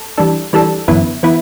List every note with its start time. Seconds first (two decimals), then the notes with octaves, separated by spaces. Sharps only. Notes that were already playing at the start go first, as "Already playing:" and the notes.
Already playing: A4
0.18 E3 G3 D4 A4
0.53 E3 G3 D4 A4
0.88 G1 F#2 E3 B3 E4
1.23 E3 B3 E4